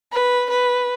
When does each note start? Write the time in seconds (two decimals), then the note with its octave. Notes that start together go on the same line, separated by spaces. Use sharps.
0.12 B4
0.50 B4